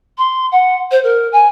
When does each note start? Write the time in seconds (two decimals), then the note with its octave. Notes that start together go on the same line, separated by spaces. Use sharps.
0.18 C6
0.52 F#5
0.91 C5
1.04 A#4
1.32 G#5